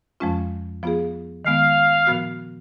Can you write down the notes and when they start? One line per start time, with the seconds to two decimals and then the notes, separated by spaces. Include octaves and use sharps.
0.20 F2 F3 G#3 C#4 F4
0.83 F3 B3 F4 G#4
1.45 D#3 G#3 B3 F5
2.07 A#2 F3 B3 F#4